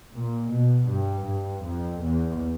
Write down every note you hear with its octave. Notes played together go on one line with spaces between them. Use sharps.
A#2
B2
G2
G2
F2
E2